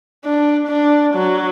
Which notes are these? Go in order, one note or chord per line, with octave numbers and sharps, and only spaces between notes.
D4
D4
F#3